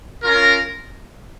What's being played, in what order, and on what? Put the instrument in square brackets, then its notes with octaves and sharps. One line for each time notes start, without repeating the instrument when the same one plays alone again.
[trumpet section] C#4 F4 A#4